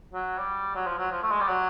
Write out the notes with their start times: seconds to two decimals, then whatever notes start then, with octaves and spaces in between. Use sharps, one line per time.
0.13 F#3
0.38 G3
0.75 F#3
0.87 F3
0.98 F#3
1.11 F3
1.23 A3
1.31 G#3
1.40 G3
1.48 F#3